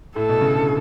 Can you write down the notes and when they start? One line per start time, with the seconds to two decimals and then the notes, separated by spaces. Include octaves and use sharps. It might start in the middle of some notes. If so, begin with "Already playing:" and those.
0.16 A2 A4
0.29 B2
0.41 C#3
0.54 D3